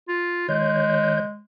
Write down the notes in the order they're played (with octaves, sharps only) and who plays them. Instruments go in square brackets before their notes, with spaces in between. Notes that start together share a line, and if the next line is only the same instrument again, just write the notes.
[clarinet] F4
[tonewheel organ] D#3 C#5 G6 [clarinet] G#3